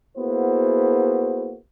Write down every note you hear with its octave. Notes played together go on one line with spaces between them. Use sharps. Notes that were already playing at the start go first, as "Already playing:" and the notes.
A#3 B3 E4 F#4 G#4 C5